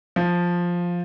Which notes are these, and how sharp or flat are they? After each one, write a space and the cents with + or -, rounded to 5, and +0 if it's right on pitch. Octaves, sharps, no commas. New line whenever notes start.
F3 +5